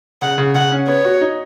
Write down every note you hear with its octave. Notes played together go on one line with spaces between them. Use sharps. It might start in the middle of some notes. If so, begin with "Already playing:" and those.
C#3 F#5
C#3
C#3 F#5
C#4
B3 C#5
F#4
D#4